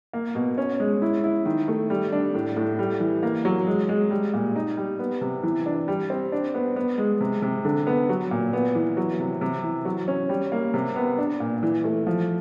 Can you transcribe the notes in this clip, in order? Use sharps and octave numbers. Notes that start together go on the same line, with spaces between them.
A#3
B2
C#4
G#3
E4
E4
D#3
A3
G3
D4
A2
A2
G3
E3
A#3
F#3
G#3
G#3
G3
A#2
D#4
G3
B3
C3
E3
D4
G3
C4
D4
B3
B3
G#3
C3
C3
D3
B3
F#3
A#2
B3
E3
F#3
C3
C3
E3
F#3
C#4
G3
A#3
C3
B3
D4
A#2
E3
A3
F3